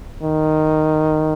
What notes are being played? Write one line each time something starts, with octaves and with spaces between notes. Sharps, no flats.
D#3